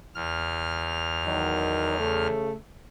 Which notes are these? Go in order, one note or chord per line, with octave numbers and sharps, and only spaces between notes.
E2 F6
D#3 F#3
C#3 A3